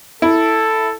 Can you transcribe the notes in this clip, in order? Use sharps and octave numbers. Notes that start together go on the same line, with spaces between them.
E4 A4